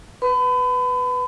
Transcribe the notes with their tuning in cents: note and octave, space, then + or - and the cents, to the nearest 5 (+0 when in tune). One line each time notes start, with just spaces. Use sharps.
B4 +0 B5 +35